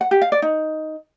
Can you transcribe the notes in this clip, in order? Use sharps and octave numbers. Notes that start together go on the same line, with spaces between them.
F#5
G4
F5
D5
D#4